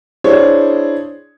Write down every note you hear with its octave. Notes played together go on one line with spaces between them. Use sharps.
D4 E4 G#4 C5 C#5